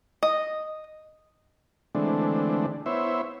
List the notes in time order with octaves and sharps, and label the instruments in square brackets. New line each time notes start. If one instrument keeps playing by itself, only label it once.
[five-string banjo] D#5
[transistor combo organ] D3 E3 G#3 A3 C4 D4
B3 E4 C5 C#5 E5